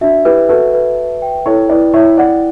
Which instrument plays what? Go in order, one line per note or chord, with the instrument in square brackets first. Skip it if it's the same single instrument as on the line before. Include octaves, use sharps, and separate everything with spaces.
[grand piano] D4 F#4 [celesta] E5
[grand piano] E4 G4 [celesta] B4
[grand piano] F#4 A4 [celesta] B4
[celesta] B4
B4
G5
[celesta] E4 [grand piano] A4 C#5
[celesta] E4 [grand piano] B4 D5
[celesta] E4 [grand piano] C#5 E5
[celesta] E4 [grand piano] D5 F#5